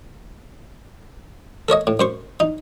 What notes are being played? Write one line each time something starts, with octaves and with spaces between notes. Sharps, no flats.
A4 A#4 C#5 D#5
A2
F#2 C5 C#6
D#4